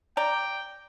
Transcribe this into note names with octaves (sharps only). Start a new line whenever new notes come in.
D5 G5 A#5